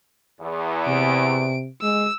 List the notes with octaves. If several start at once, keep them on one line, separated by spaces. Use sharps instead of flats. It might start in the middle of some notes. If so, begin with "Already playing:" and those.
E2
C3 D7
G#3 E6